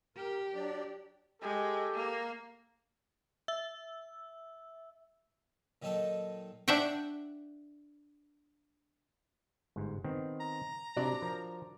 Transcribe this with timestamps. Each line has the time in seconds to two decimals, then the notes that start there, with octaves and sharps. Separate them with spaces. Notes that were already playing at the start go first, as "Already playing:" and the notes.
0.16 G4 A#4
0.54 F#3 D4 D5
1.42 G#3 G4 A4
1.94 A#3
3.48 E5 E6
5.82 A#2 D#3 F#3 D#4 A4
6.68 D4 D5 E5 F#5 G5
9.76 G1 G#2
10.04 D#3 B3 C4
10.40 A#5
10.96 C3 F#3 D4 D5
11.22 F3 A#4